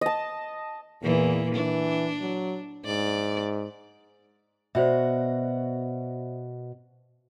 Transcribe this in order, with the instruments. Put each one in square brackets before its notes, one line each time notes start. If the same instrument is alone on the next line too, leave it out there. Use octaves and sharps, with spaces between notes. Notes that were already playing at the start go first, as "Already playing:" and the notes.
[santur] D#5 A5
[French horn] E2 [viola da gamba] A#2 E3
[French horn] E3 [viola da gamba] D4
[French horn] F#3
[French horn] G#2 [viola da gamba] D5
[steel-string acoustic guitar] B2 F#4 [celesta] C5 D5 E5